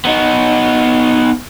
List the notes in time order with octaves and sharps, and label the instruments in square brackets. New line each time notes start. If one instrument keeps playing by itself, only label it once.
[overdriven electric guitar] B3 D#4